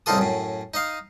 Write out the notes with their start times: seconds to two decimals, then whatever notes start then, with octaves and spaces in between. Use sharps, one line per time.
0.06 C2 A2 D#4 F4 A4 D#6
0.18 F#2 A2
0.74 D#4 D#5 F5